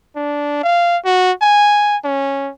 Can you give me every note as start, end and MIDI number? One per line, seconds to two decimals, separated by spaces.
0.16 0.59 62
0.64 0.97 77
1.05 1.32 66
1.42 1.97 80
2.04 2.50 61